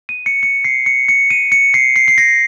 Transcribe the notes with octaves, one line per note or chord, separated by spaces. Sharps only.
D#7
C#7
C#7
C7
C#7
C#7
D#7
C#7
C7
C7
C7
A#6